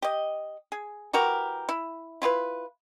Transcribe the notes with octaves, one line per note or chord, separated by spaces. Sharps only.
G4 D#5
G#4
E3 F#4 G4 A#4
E4
E4 F4 G#4 B4